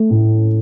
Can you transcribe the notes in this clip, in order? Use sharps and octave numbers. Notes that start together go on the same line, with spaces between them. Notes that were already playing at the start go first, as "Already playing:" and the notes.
Already playing: A3
A2